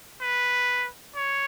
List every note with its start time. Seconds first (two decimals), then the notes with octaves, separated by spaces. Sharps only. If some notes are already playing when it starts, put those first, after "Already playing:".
0.21 B4
1.16 C#5